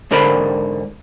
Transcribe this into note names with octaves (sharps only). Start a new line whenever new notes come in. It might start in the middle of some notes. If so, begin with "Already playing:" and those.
G#2 D3 A#4 C5 D5 B5